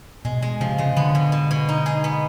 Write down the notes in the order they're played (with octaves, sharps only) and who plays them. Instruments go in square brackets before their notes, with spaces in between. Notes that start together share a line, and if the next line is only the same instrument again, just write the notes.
[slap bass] B2 [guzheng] G#3
[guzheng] G#3
[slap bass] C3 [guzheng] F3
[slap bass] C#3 [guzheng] G#3
[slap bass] D3 [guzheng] B3
[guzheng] B2
B2
B2
D#4
G#4
B3